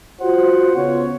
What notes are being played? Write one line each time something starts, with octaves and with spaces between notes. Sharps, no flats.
F4 F#4 C5 F#5
C#3 B3 F4 C#5